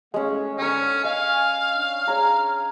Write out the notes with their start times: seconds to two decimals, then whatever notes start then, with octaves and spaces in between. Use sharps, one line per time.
0.14 E2 G#3 A3 C#4 F5
0.58 G#2 D3 C#4 G5 C#6
1.04 D#5 F5 G#5
1.76 D4
2.08 G#4 C#5 A#5